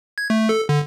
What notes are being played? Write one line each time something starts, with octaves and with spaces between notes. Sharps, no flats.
G#6
A3
A4
D3